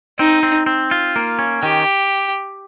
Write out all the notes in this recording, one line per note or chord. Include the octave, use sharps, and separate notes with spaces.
C4 D#4
C4
C4
F4
A#3
C#4
D#3 G4